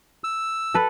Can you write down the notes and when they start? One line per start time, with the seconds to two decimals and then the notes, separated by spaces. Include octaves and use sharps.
0.24 E6
0.74 A4 B4